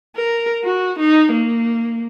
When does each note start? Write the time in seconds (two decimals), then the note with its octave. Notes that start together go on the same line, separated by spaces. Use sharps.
0.16 A#4
0.64 F#4
0.99 D#4
1.32 A#3